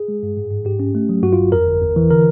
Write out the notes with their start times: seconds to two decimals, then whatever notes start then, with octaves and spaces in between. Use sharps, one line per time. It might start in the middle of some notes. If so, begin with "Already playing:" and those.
Already playing: G#4
0.08 G#3
0.23 G2
0.37 G#2
0.51 G#2
0.65 G#2 G4
0.80 C#4
0.95 A3
1.09 F#3
1.23 G2 F#4
1.33 F4
1.38 G1
1.52 F2 A#4
1.67 G1
1.82 E2
1.96 E3
2.10 D3 A#4